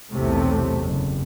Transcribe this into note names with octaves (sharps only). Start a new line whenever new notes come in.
B1 E2 A2 C3 A3
F#1